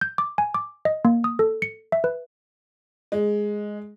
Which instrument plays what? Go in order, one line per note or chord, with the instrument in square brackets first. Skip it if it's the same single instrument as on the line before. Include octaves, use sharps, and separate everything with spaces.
[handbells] G6
D6
G#5
D6
D#5
A#3
D#6
A4
C#7
E5
B4
[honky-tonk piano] G#3